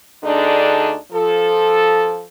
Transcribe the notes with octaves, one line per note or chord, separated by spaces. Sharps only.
D2 D3 D4 D#4 G#4 D5
F3 A4